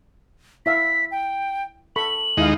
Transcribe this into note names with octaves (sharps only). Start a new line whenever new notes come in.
E4 E5 F5 B6
G5
A4 B5 C#6 F#7
D#2 G#3 D#4 E4 F5